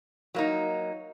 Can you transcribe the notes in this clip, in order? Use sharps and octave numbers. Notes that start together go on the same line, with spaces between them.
F#3 A#3 D#4